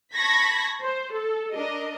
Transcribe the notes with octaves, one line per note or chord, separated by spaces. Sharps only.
A5 B5 C#6 G#6 A#6 B6
C5
A4
D4 A#4 D#5